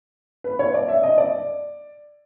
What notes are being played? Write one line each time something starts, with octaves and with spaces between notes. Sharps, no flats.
B4
C#5
D5
E5
D#5
D5